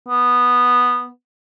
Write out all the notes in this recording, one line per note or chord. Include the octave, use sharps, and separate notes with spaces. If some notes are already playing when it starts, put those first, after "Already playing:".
B3